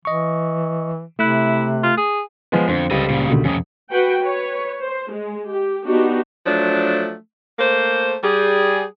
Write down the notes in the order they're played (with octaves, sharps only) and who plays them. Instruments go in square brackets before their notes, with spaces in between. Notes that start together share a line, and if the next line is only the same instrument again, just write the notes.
[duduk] E3 [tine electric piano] D#5 C#6
[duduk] C3 [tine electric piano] A3 F#6 [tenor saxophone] E4
[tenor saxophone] F4
G#4
[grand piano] F3 G#3 B3
[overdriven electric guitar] F2 [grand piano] D3 [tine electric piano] C5
[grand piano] C#2 G3 [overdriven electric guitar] A4 D#5
[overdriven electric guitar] A#2 C#3
[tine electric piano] B2 D3 D#3
[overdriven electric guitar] F2 C3 [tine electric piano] C#4 D#6
[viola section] F#4 B4 F#5 G5
B4 C#5
C5
G#3
G4
B3 D4 D#4 F#4 G4
[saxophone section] F3 F#3 A3 D4
A3 A#3 C5
G3 G#4